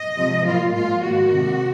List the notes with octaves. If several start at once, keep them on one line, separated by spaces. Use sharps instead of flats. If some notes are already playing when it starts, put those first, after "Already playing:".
Already playing: D#5
C3 F3 G#3
A#2 F#3 A#3 F4
A#2 F3 G#3 F4
G#2 D#3 A#3 F#4
F2 C3 D#3 G#3